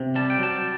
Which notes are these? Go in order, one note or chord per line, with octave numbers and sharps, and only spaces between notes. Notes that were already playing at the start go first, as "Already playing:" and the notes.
Already playing: C3
G3 A5
G5
F#3 A5